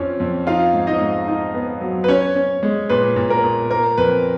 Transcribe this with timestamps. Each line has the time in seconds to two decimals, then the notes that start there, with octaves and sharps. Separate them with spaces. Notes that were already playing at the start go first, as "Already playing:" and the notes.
Already playing: F2 F3 C#4
0.20 F2
0.47 D#4 F4 F5
0.74 G#2
0.87 D#4 D#5
1.01 G#2
1.28 D#4
1.54 B3
1.81 F#3
2.04 B4
2.08 C#4 C#5
2.36 C#4
2.63 G#3
2.89 A#2 B4
3.16 A#2
3.30 A#4
3.44 A#2
3.71 A#3 A#4
3.98 F2 B4